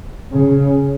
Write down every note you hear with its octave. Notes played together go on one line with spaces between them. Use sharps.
C#3